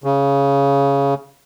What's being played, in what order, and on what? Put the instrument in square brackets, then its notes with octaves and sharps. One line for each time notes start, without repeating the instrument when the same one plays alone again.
[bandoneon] C#3